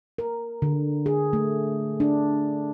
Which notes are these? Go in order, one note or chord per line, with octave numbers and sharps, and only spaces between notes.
A#4
D3
G#4
A3
D4